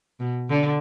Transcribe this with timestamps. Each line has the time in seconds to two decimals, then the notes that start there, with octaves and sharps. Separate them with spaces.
0.20 B2
0.50 D3